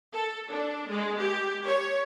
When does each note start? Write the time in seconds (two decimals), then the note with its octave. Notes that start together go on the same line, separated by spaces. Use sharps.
0.14 A4
0.49 D4
0.89 G#3
1.20 G4
1.66 C#5